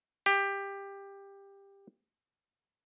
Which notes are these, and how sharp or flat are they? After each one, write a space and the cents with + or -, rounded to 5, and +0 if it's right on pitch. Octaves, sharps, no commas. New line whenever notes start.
G4 +15